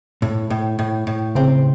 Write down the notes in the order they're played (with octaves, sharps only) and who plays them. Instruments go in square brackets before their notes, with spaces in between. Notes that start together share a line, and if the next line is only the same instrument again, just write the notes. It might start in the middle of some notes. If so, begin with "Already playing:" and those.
[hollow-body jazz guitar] A2
A2
A2
A2
[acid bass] C#3 [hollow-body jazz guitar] C4